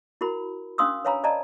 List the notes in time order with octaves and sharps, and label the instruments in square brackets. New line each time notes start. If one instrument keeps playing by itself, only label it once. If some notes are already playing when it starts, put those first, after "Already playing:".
[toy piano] E4 F#4 A#4 B5
C#4 D4 F5 C6 D#6 E6
B4 C#5 F5 G#5 A#5 B5
D5 D#5 A5 A#5